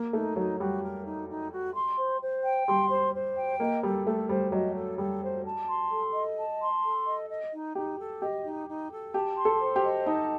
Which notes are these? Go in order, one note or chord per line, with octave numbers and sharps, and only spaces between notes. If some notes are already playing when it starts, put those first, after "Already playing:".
Already playing: A#3
A3 D#4
F#3 D#4
G3 F#4
A#4
D#4
D#4
F#4
C6
C5
C5
G5
G3 C6
C5
C5
G5
A#3 D#5
G3 A4
A3 A4
G3 C5
F#3 D#5
A4
G3 A4
C5
A5
C6
A4
D#5
A5
C6
A4
D#5
D#5
D#4
D#4 G4
A4
G4 D#5
D#4
D#4
A4
G4 A5
C6
A4
C5
G4
D#5
D#4 A5